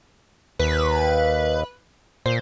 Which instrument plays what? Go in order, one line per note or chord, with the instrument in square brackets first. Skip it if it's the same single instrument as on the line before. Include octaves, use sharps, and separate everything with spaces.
[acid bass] D#2 [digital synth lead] B4
[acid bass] A#2 [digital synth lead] C5